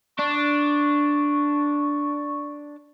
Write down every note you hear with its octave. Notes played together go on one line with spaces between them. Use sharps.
D4 C#6